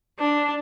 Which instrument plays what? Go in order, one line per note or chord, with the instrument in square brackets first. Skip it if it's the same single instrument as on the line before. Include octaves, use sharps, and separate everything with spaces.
[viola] D4